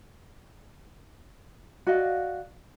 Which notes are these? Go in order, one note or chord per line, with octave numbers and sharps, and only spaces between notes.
F#4 D5 D#5 F5